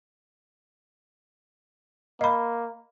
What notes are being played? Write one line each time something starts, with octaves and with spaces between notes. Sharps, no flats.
A#3 D#5 B5